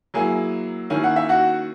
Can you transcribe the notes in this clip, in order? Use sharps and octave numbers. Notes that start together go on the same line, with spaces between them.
F#3 A#3 E4 G#4 G#5
D#3 A#3 C#4 E4 G#5
F#5
E5
F#4 F#5